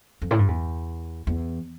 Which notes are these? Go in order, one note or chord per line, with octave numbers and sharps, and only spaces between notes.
F2
A2
G2
E2
E2